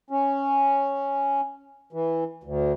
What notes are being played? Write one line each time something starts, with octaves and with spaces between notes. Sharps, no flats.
C#4
E3
D2